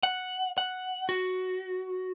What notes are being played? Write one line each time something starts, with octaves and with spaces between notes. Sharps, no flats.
F#5
F#5
F#4